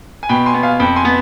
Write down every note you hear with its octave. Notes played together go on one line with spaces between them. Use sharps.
G#5
B2 G5 B5
G#5 C6
B3
F5 G#5
F2 G5 B5
G#5 C6
B3